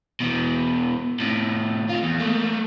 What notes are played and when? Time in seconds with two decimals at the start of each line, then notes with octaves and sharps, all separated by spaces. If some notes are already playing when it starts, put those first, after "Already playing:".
0.20 B2 E3
1.20 A2 C3
1.89 A2 F4
2.03 E2
2.20 A3 A#3